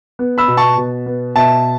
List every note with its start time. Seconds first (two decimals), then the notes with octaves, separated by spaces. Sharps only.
0.19 B3
0.38 B5 E6
0.48 B2
0.57 A5 C#6
0.77 B2
1.06 B3
1.36 B2 E5 A5